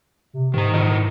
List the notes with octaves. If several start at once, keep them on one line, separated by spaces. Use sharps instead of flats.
C3
G#2 D#3 A#5
E4 A#4 D#5